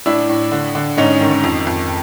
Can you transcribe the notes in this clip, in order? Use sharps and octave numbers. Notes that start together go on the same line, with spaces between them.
A2 D4 E4
A2
D3
D3
G#2 C#4 D#4
D#3
F2
F2